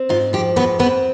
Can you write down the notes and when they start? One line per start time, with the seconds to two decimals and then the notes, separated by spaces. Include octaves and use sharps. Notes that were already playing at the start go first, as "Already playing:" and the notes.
Already playing: C4
0.09 G#2 F4
0.33 F3 G4
0.56 G#2 B3 B4
0.79 B3 C4 B4